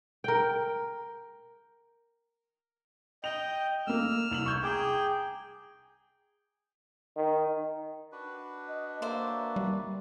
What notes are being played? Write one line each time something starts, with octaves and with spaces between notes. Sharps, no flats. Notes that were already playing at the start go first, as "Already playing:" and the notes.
A#4 G5
D#5 G5 F7
A3 A#3 E6 F6
C2 F7 F#7
C#6 G6 G#6
G#4 G5 A#5 D6
D#3
D4 F#4 B4
D#5
A#3 C5 D5 E5
G3